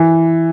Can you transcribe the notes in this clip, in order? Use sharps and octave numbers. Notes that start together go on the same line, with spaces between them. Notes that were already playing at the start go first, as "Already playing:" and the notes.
Already playing: E3